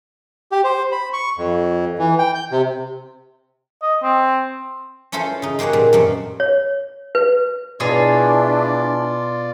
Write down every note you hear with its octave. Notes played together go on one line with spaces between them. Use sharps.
G4
C5
B5
C#6
F2
E3
G5
G6
C3
D#5
C4
C#4 E4 F4 A4 C5
C#3 D#4
G#3 A#3 G4 C#5 F#5
A#2 G3
F#2 A3 C4
C#5
B4
B2 D4 E4 F4 G#4 C#5 D5